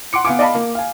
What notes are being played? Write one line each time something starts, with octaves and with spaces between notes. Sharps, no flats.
F#5 C6 D6 C#7
B3 F5 G#5 D6
D5 D#5 F5 A5 B5
A#3
F5 G#5